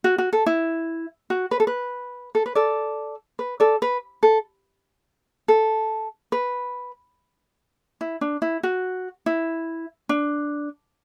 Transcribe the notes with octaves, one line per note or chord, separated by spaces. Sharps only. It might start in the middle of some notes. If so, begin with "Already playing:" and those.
F#4
F#4
A4
E4
F#4
B4
A4
B4
A4
B4
A4 D5
B4
A4 D5
B4
A4
A4
B4
E4
D4
E4
F#4
E4
D4